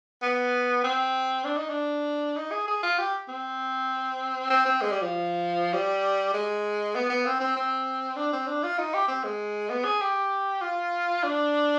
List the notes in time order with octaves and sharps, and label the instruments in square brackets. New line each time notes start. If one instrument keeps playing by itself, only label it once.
[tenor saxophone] B3
C4
D4
D#4
D4
D#4
G#4
G#4
F4
G4
C4
C4
C4
G#3
G3
F3
G3
G#3
B3
B3
C4
C4
C4
D4
C4
D4
F4
D#4
G4
C4
G#3
B3
G#4
G4
F4
D4